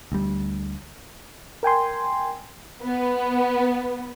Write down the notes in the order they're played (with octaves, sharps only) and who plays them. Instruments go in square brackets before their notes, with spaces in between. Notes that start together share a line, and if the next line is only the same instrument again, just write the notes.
[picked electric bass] D2 G3
[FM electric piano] A#4 G5 G#5 C6
[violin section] B3